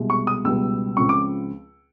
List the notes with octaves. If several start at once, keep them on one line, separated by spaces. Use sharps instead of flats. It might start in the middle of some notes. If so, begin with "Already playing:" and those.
Already playing: C2 B2 G#3
C#6
D#6
C#2 B2 G3 B3 E6
C#2 C#3 F3 G#3 C4 C#6
D6